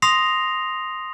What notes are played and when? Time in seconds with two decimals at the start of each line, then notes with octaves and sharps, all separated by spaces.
0.02 C6 D#6 A#6 C7 F7